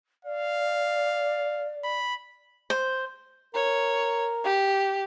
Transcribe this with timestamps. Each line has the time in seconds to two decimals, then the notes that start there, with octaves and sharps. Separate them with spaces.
0.25 D5 F5
1.84 B5
2.70 C5
3.55 A#4 C#5
4.44 G4